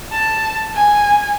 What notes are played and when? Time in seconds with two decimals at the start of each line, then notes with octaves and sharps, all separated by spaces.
0.12 A5
0.76 G#5